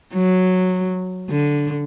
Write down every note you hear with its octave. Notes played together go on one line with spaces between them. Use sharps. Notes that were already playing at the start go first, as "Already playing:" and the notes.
F#3
D3